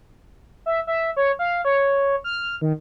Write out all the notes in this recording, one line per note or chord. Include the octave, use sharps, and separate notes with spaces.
E5
E5
C#5
F5
C#5
F6
D#3